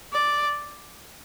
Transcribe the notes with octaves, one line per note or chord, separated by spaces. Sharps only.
D5